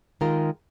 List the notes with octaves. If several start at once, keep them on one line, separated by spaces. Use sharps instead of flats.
D#3 G#3 F4 A#4